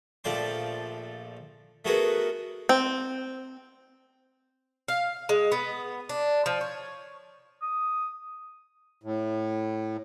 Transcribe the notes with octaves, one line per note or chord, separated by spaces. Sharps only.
A#1 F3 A3 D5 G5 C6
A3 B3 F#4 G#4 A#4 B4
C4
F5
G#3
B3
D4
F3
C#5
D#6
A2